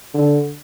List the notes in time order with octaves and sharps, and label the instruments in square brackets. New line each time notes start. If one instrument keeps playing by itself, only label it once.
[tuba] D3